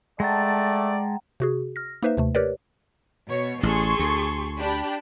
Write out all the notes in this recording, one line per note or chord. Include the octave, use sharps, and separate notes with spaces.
G#3 A3 D5 F#5 G5 A5 A#5
C3 F#4 G#4
F6 A#6
A#3 D#4 B4 C5 E5
D#2 C3 A3
G4 A#4 B4 C#5 D5
B2 C#5
A1 G#4 A4 C6 C#6
D2
D4 G4 B5